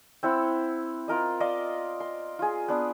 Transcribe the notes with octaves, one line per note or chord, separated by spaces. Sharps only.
C4 E4 F#5
F4 A#4 D#5
D5 D#5 F5
C6
F4 G#4
B3 D4